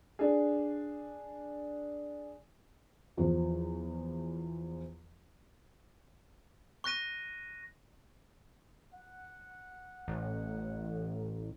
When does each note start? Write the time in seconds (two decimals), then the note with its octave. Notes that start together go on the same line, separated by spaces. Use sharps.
0.19 D4 G#4
3.17 E2 F3
6.84 C#6 F#6 A#6 D#7
8.94 F#5
10.08 A1